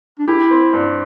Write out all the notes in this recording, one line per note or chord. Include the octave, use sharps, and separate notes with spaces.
D4
E4 G4
C4
G2